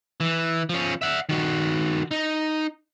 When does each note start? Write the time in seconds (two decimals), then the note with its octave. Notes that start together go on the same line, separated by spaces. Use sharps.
0.20 E3
0.70 F3 C#4
1.02 E5 F#5
1.29 D#3 F#4
2.11 D#4